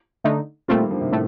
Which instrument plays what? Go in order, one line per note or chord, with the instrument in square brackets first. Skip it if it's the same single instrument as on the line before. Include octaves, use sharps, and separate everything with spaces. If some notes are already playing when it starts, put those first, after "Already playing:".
[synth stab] D3 A3 D#4
[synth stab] A#2 A3 C4 F4 [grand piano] G3 A#3
[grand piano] D#3 G3
D3 F3
C3 D#3
[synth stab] A2 A3